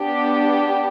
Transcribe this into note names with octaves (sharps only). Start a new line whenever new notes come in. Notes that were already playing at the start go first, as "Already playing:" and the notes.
Already playing: B3 D4 G4